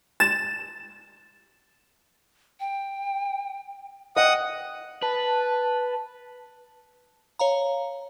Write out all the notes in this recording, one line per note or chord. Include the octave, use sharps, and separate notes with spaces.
A6 E7
G5
D#5 F#5 G5 D#6
B4 A5
C#5 F5 A#5